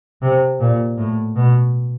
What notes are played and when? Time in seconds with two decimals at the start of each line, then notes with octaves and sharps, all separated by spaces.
0.22 C3
0.60 A#2
0.98 A2
1.36 B2